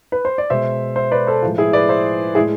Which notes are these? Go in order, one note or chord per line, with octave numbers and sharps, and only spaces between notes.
B4
C5
D5
B2 G#3 C5 E5
C5 E5
B4 D5
A4 C5
A2 F3 G#3 F4
E4 G#4
B4 D5
C5 E5
A2 G#3 E4 G#4